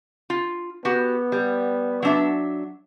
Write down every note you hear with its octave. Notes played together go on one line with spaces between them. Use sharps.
F4
B3 F#4 G4
G3
F#3 D4 E5